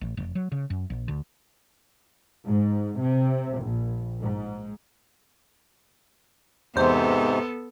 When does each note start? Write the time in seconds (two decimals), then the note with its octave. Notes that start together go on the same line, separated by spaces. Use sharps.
0.01 A1
0.17 F1
0.35 F#3
0.52 C#3
0.70 F#2
0.90 A#1
1.08 D2
2.47 G#2
3.00 C3
3.60 A#1
4.20 G#2
6.76 E2 G#2 C3 B3 A4 C5